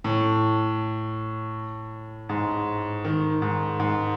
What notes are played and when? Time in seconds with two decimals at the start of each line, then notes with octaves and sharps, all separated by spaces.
0.04 A2
2.29 G#2
3.04 D#3
3.42 G#2
3.80 G#2